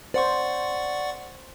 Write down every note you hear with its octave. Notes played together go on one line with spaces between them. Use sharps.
C5 D5 F#5 C#6